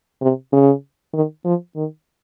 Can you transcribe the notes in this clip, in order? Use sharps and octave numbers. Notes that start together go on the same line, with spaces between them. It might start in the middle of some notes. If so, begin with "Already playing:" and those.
C3
C#3
D#3
F3
D#3